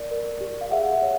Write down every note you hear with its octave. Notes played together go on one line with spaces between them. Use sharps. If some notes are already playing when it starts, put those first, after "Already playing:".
Already playing: A#4 D5
A#4
G4
F5
G#4 E5 F#5
E5
C#5